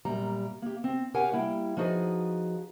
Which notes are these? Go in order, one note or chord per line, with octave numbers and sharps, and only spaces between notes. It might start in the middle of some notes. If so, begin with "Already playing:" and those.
F#2 A#2 G3 A#5
A#3 G4
C4
G4 A#4 C#5 F5 F#5 G#5
G3 A#3 E4 G5
F3 D#4 F#4 G#4 B4